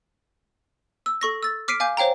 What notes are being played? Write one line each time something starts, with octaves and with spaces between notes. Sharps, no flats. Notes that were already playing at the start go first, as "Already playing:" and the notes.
E6
A4 C#6 A#6
E6 A6
D6 F6 B6 C7 D7 D#7
F5 G#5 D6 G6
C5 C#5 F5 G5 A#5